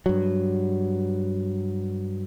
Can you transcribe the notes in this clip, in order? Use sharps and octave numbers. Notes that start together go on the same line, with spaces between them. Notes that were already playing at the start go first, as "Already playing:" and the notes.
G2 F#3